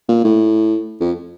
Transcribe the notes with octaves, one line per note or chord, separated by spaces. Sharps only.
A#2
A2
F2